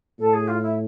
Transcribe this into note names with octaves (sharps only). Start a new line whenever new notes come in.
A2 A4
G#4
F4
E4